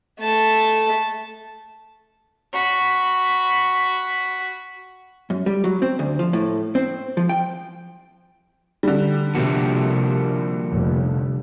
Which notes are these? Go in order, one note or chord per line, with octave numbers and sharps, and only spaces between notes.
A3 A5
F#4 B5
F#2
G3
F#3
C4
D2
F3
A2
C4
F3
G5
D3 G3
C3 F3 A#3 F#4
F1